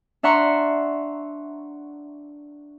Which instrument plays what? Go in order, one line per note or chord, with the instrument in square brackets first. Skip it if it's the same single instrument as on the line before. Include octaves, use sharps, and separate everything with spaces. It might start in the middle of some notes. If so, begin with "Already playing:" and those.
[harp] D4 E5 F#5 A#5 C6 C#6